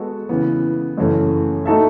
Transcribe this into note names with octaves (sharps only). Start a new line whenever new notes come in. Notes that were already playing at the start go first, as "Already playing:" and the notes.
Already playing: G#3 B3 F#4 A4
C#3 E3 B3
F#2 C#3 E3 A3
A3 D#4 F#4 A4 E5